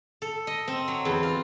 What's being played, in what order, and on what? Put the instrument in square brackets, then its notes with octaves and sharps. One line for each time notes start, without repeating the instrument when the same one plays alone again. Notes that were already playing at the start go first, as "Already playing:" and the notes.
[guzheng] A4
D#5
C4
F#3
E2
F4